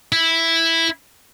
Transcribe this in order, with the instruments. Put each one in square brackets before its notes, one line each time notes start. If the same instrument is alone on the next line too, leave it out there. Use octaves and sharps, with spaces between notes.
[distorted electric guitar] E4